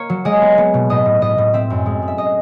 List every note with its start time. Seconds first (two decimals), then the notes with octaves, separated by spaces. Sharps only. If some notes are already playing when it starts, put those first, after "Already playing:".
Already playing: A#3 C#5
0.10 F#3
0.25 G#3 D#5
0.41 B3
0.58 B3
0.74 B2
0.90 A2 D#5
1.05 A2
1.22 A2 D#5
1.38 A2
1.53 C4 E5
1.70 F#2
1.86 G#3
2.02 G#3
2.08 E5
2.18 D#5